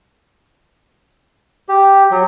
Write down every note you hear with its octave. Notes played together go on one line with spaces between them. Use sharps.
G4
F#3